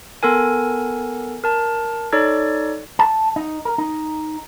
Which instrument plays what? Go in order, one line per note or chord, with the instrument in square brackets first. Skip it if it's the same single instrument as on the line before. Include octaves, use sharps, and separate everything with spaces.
[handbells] B3 A4 A#4 G#5
A#4 A5
D#4 A4 C#5 D5
[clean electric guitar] A5
D#4
A#4
D#4